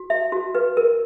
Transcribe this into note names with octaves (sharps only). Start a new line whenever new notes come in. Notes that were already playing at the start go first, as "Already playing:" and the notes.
Already playing: F#4
E5
F#4
B4
A#4